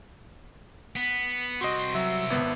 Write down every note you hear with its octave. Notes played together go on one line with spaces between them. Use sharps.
B3
C2 C4 F#4 D#5 C6
F#3 E5
G#1 B3